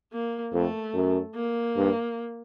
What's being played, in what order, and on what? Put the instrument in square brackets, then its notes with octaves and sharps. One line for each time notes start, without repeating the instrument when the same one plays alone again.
[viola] A#3
[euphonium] F2 [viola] A3
[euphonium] F#2
[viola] A#3
[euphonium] G2